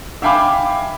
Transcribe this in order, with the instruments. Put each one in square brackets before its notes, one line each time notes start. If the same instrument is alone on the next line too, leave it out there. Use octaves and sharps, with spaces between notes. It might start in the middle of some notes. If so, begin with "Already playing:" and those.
[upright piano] E5 F5 G5 G#5 B5 D6